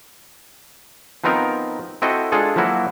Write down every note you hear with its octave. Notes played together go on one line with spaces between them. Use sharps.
F3 B3 C4 D#4 A#4
C4 E4 F#4 A4 D#5
G#3 D4 F4 G#4 A4
F3 F#3 A#3 E4 F#4